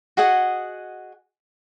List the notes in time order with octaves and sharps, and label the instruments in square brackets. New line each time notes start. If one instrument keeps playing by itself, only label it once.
[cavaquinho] F#4 G#4 D#5 F#5